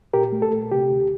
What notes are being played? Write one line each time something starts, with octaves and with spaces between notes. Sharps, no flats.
A#2 G4 A#4
A3
A4
A#2
C3 G4
D2